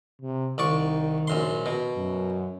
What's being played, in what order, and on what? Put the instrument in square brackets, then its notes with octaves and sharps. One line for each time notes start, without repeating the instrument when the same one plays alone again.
[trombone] C3
[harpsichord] C2 D5 C#6 [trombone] D#3
[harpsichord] A#1 F#2 C6
B2
[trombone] F#2